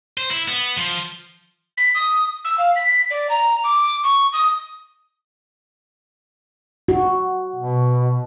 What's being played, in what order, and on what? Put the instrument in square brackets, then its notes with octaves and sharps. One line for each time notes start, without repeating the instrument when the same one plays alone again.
[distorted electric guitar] C5
E4
B3
F3
[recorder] B6
D#6
E6
F5
B6
D5
A#5
D6
C#6
D#6
[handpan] F#4
[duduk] B2